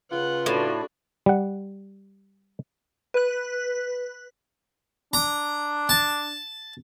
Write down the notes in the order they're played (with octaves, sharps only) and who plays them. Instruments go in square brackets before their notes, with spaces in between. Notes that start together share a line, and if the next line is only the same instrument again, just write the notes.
[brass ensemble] C#3 B4 [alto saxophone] F4 [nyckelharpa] F#5
[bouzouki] A2 [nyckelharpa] D4 F#4
[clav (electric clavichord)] G3 F#5
[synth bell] B4 F#6
[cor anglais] D4 [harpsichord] A#5
[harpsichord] A5